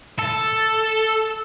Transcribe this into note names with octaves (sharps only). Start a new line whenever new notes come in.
A4